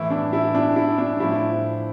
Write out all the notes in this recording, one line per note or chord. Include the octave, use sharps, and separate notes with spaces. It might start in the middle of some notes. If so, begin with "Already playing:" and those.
Already playing: A2 E3 E4
D4
E4
D4
E4
D4
A2 F3 E4